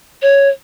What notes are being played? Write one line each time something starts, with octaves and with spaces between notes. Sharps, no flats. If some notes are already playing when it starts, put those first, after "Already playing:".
C#5